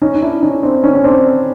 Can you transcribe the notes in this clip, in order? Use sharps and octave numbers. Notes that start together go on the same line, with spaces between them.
C#4 D#4
D#4
D4 E4
C#4 D#4
C4 D4
C#4 D#4
C#4
C4 D4